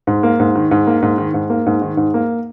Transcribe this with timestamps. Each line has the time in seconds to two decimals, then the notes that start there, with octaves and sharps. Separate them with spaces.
0.07 G#2
0.23 A#3
0.40 G#2
0.56 D#3
0.71 G#2
0.87 A#3
1.02 G#2
1.18 D#3
1.34 G#2
1.50 A#3
1.66 G#2
1.82 D#3
1.97 G#2
2.14 A#3